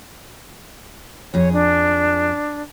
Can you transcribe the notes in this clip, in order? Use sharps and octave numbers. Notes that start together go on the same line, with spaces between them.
F2 G#4 C#5
D4